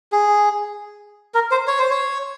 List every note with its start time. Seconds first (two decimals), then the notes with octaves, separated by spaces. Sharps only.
0.12 G#4
1.35 A#4
1.51 C5
1.67 C#5
1.79 C5
1.91 C#5